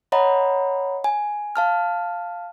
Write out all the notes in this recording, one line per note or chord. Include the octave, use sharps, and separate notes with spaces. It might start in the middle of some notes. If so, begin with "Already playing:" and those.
C#5 D#5 F#5 A#5 B5
G#5
F5 A5 F6